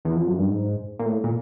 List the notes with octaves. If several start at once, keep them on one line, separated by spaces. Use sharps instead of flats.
E2
F2
F#2
G2
G#2
A#2
A2
A#2